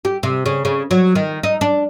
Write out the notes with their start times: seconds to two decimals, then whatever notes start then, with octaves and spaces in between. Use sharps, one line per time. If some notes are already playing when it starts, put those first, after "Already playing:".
0.05 G4
0.23 C3
0.46 C#3
0.65 C#3
0.91 F#3
1.15 D#3
1.43 D#4
1.61 D4